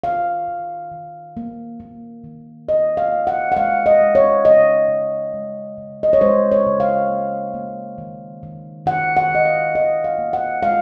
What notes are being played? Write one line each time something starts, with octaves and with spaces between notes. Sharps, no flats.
D#3 F5
D#3
D#3
A#3
A#3
D#3
A#3 D#5
F5
A#3
F#5
F#5
G#3 F5
D#5
G#3
C#5
C#3 D#5
C#3
G#3
C#3
D#5
C#5
G#3 C5
C#5
C#3
F5
A#3
A#3
D#3
D#3
D#3 F#5
F#5
D#3 D#5
F5
D#3 D#5
F5
A#3
F#5
G#3 F5